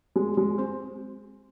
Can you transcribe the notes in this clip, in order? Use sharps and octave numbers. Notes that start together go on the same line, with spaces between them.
G#3
G#3
C4